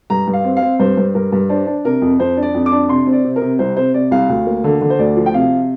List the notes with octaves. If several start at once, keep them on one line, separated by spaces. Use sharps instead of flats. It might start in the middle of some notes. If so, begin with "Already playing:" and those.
G2 A#5
G2
F5
C4
F5
C4
G2 C5
G2
G2 A#4
G2
D4 C5
D4
C3 A#4
F2
F2 C5
D4
D5
F2
D6
D4
C3 C6
C4
D5
C3
A#4
C3
C2 C5
C3 C5
C3 D5
C2 F5
D2
A#3
D3
D3
C5
D2 D5
F3
G5
C3 F5